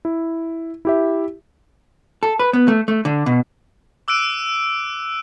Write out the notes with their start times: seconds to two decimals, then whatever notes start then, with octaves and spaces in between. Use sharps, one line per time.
0.05 E4
0.85 E4 G4 E5
2.23 A4
2.39 B4
2.53 B3
2.68 A3
2.88 A3
3.05 D3
3.26 B2
4.08 D6 E6 F#6 D7 D#7